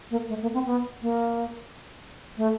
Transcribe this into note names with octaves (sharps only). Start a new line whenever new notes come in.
A#3
A3
A#3
C4
B3
A#3
A3